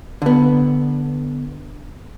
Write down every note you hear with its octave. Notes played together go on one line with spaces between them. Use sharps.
D3 B3